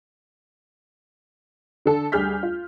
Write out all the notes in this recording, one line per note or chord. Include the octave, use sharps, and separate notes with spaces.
D3 A4
D2 G3 G#4 F6 G6 B6
F4